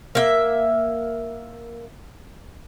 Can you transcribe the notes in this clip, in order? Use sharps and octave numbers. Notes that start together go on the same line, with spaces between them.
A#3 E5